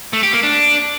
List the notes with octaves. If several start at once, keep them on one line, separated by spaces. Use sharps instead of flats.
A3
G4
A#3
D4